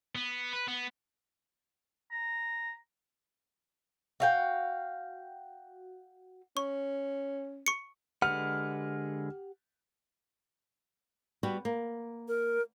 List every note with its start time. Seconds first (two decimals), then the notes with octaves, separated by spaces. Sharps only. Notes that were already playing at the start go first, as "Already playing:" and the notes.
0.15 B3
0.53 B4
0.68 B3
2.11 A#5
4.20 F#4 F5 G5
6.57 C#4 C#6
7.66 C#6 C#7
8.22 D3 G#3 G4 B4 F#5 F6
11.43 G3 B3 F#4
11.65 A#3
12.28 A#4